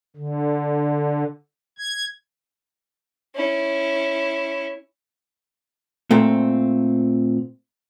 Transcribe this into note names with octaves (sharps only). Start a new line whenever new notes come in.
D3
G#6
C#4 E4
A#2 A3 C4